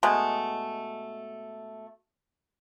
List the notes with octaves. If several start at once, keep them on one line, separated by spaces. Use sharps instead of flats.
B2 G#3 A3